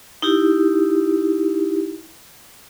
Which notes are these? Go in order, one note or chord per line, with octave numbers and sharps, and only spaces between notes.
D#4 E4 G4